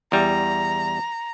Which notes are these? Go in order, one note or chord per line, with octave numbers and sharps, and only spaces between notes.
E2 G3 A#5